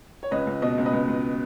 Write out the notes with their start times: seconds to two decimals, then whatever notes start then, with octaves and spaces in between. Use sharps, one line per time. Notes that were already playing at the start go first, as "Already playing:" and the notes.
0.23 C#5
0.31 C#2 B4 D#5
0.47 C#2
0.62 B2 D#5
0.78 C#2
0.86 B4 D#5
0.93 C#2
1.08 C#2